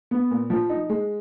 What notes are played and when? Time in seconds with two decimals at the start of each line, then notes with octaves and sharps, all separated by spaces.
0.11 B3
0.31 A#2
0.50 F3
0.70 D#4
0.89 G#3